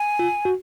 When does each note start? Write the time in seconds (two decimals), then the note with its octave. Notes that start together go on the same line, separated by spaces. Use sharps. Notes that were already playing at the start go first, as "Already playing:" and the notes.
Already playing: G#5
0.19 F4
0.45 F#4